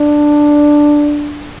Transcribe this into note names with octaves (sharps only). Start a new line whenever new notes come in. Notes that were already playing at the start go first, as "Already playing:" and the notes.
Already playing: D4